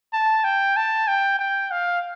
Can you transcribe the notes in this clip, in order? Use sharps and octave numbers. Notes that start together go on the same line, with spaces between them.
A5
G5
A5
G5
G5
F5